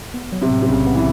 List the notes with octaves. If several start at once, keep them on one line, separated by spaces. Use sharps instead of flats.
B3
F#3
C3
A2
C3
B1 C#3
B3
E3